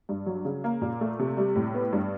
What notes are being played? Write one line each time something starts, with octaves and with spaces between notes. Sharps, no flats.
G2
F#3
C#3
A#3
A#2
A3
C3
G3
A2
B3
G2